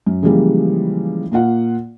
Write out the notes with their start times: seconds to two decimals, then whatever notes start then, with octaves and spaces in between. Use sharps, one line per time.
0.07 F#2
0.23 C#3 E3 F3 G3 G#3 A#3
1.32 A#2 A#3 F4 F#5